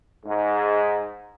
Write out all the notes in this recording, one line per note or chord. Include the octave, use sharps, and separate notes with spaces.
G#2